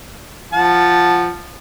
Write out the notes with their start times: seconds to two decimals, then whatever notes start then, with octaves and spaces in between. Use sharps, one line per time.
0.53 F3 F#5 A5